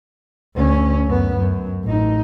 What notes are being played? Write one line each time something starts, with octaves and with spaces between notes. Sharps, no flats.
D2 C#4
F#2 B3
F#2
A1 D#4